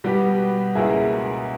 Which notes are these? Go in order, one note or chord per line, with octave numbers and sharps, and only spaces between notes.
B2 G3 B3 G4
C#2 B2 A#3 E4 G#4